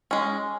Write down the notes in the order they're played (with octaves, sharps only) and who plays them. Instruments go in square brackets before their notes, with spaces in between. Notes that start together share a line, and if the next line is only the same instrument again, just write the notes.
[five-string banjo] G#3 C#4